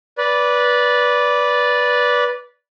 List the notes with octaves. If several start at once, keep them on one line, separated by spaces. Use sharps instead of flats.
B4 D5